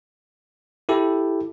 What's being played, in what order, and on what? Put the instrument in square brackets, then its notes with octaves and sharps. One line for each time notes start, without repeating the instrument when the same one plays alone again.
[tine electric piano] E4 G4 A4